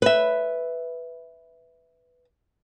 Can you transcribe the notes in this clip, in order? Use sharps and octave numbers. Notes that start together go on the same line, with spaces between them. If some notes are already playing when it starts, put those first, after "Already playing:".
B4 E5